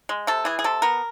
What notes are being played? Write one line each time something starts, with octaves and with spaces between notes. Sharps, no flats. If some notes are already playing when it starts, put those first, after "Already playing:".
G#3
C3 A4
E3 G#4
G#4
C3 A4
B3 A#4